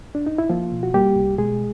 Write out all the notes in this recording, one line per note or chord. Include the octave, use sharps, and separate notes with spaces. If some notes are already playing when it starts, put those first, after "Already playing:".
D4
D#4
E4
F3 A#3 F4
B2
F#4
G3 A#3 G4
C2
B2 G#3 G#4